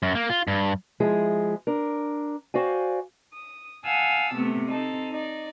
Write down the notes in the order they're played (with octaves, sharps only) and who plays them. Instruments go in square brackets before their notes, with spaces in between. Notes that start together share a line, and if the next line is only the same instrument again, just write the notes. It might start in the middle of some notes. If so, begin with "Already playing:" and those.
[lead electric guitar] F#2
A#3
F4
G2
[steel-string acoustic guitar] F3 G#3 E4 G#4
D4 A#4
F#4 C5 D5 F5 G5 G#5
[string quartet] D#6
F5 F#5 G#5 A5 D#6 E6
C3 A3 B3
C4 D#4 A4
D#4 D5